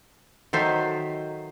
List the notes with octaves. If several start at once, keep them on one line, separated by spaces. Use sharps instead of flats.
D#3 F#3 A4 C5 E5